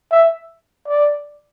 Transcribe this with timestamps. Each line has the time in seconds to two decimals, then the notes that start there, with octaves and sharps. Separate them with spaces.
0.11 E5
0.87 D5